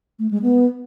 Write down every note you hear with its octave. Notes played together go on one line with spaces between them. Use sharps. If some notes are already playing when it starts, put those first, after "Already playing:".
A3
G#3
B3